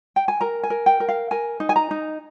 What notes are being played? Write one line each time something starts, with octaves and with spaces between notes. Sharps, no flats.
G5
G#5
A#4 A#5
G#5
A#4
G5
A#4
F5
A#4 G#5
D#4
G#5
A#5
D#4